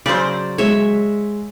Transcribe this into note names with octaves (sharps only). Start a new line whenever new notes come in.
C#3 F#3 C5 D5
G#3 C#5 E5